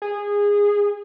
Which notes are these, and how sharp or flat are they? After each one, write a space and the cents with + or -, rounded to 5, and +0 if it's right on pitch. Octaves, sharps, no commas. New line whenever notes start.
G#4 -20